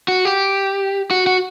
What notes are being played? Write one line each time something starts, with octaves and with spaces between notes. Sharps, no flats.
F#4
G4
F#4
F#4